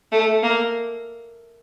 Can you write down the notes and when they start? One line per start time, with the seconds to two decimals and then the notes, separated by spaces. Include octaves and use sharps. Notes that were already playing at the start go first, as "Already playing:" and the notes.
0.12 A3
0.43 A#3